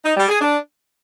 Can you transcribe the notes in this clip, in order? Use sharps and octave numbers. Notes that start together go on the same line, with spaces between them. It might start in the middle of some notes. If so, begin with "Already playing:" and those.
D#4
G3
G#4
D4